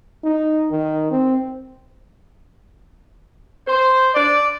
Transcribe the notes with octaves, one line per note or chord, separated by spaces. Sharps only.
D#4
D#3
C4
C5
D5